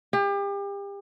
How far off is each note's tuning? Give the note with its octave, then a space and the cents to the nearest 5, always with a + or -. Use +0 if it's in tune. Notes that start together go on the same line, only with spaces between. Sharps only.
G4 +35